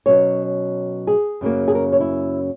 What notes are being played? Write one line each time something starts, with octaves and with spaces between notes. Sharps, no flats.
B2 F#3 C#4 C#5
G#4
F#2 C#3 F#3 A#3
G#4
A#4
C#5
E4